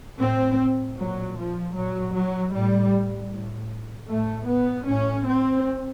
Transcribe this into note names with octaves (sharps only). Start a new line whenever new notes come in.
A2 C4
A#2 F#3
F3
A#2 F#3
F#3
A2 G3
A2
A2 A3
B3
A2 C#4
C4